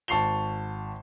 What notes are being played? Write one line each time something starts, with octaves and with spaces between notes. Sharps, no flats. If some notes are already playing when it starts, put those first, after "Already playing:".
G#1 A5 C#6 C7 F7 G7